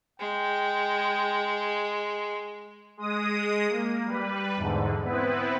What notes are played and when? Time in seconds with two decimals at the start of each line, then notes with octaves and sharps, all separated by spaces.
0.20 G#3 G5
2.97 G#3 D#6
3.69 A#3
4.05 G3 B4
4.57 E2 G#2 D3
5.04 B3 C4 E4 B4